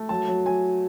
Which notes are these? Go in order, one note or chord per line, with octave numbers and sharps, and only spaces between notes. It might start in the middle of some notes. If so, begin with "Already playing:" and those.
Already playing: A3
F#3 A5
F#3
F#3 G#5